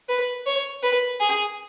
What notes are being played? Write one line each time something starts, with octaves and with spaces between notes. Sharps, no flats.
B4
C#5
B4
G#4